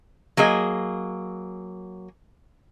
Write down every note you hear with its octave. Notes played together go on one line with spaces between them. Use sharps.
F#3 A#3 G#4 D#5